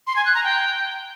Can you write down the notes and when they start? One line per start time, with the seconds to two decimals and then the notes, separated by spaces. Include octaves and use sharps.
0.07 C6
0.16 G#5
0.25 F#6
0.34 A#5
0.43 G5